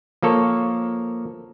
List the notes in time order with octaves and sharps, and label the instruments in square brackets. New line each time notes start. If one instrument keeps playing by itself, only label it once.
[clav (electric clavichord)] F3 A#3 A4 C#5